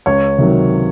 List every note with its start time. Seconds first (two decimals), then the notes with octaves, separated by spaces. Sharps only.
0.06 C#2 C#5
0.38 C3 D#3 F#3